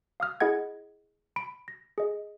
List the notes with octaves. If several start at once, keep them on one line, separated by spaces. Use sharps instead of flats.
F5 D#6 F6
E4 G#4 D#5 F#5 G#6
B5 D7
A#6
G#4 D#5